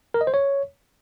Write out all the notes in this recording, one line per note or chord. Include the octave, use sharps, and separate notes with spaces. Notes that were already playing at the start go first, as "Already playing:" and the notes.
A#4
D#5
C5
C#5